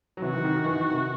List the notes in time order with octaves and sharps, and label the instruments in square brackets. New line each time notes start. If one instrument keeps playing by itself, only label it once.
[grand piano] F#3
[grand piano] C3 E3 [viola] F#4
[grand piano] D#3
D#3
D#3
E3
D#3
C3